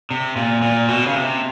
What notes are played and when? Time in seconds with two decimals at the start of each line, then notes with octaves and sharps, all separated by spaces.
0.11 C3
0.36 A#2
0.62 A#2
0.88 B2
1.07 C#3
1.15 C3